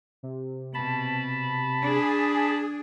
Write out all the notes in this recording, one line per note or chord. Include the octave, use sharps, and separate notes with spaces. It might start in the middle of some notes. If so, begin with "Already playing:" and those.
C3
B2 A5 B5
D4 G#4